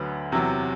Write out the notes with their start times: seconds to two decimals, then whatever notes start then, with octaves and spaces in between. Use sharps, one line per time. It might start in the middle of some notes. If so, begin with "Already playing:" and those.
Already playing: D2 D3 F#3 B4
0.32 E2 C3 F#3